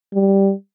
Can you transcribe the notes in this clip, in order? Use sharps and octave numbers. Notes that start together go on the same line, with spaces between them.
G3